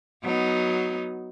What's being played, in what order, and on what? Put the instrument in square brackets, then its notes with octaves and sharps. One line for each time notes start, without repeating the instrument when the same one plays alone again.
[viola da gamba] F#3 B3 D#4